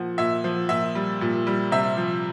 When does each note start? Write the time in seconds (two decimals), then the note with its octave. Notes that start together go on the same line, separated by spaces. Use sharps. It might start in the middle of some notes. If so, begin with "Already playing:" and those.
Already playing: A#2 F3 F#5
0.18 A#2 E5
0.44 F3
0.69 A#2 E5
0.95 G3
1.21 A#2
1.47 G3
1.72 C3 E5
1.97 F3